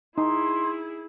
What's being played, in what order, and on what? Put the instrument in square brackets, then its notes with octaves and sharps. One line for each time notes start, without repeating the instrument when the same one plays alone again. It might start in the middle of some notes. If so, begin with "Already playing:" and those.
[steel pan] D#4 [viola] E4 G#4 [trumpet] C6